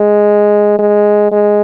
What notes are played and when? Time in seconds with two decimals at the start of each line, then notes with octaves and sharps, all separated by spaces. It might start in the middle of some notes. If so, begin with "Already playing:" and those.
Already playing: G#3
0.79 G#3
1.32 G#3